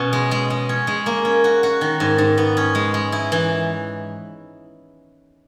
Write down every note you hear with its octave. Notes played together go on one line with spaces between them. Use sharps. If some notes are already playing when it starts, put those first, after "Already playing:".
Already playing: B2 C#4
G#3
G#3
G#3
C#4
G#3
A#3
C#4
F#4
F#4
D#3
G#2
G#2
B3
C#4
G#3
G#3
E4
E3